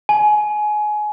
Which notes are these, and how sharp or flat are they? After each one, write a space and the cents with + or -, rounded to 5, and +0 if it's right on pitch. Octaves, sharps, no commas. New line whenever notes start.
G#5 +25